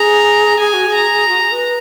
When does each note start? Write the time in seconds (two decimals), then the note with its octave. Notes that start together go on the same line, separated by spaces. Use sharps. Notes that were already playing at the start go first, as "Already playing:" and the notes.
Already playing: G#4 A#5
0.59 G#4 G#5
0.74 F#4
0.87 G#4
0.94 A#5
1.29 F#4
1.40 G#4
1.51 B4